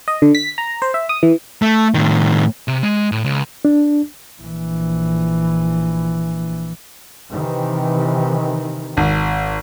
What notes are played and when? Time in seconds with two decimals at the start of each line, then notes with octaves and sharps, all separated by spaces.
0.08 D#5
0.22 D3
0.35 B6
0.58 A#5
0.82 C5
0.94 E5
1.09 D#6
1.23 E3
1.62 A3
1.94 A2 D#3
2.68 C3
2.83 G#3
3.12 A2
3.24 C#2
3.65 D4
4.41 A#1 E3
7.31 C3 D#3 E3
8.97 G#1